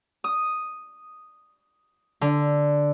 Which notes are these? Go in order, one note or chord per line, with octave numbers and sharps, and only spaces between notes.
D#6
D3